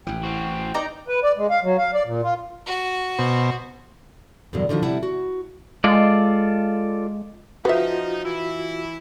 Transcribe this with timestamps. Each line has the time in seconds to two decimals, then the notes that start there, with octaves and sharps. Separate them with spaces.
0.07 A1 E3 G5
0.24 C4 F#4
0.74 D#4 D5 A#5
1.08 B4
1.23 D5
1.37 G#3
1.50 F5
1.63 F#3
1.78 F5
1.94 D5
2.06 A#2
2.23 F4
2.66 F#4
3.19 B2 C5
4.53 E2 G2 B2 D3 F#3
4.69 D3 D#3 F3 F#4
4.82 C3 G3 E4 F#5 A5
5.03 F#4
5.84 G#3 F4 A4 D5
7.65 F3 D#4 F4 F#4 B4 E5
8.26 E3 E4